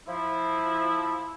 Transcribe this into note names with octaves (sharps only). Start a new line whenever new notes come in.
F3 E4